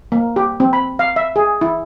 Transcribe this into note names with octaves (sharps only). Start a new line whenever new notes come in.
A#3
G4
C4
B5
F5
E5
G#4
E4